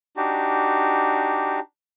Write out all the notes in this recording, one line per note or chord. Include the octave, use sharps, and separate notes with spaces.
D4 D#4 F#4 G4